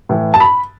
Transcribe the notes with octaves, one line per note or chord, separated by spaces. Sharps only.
A2 E3
A5
B5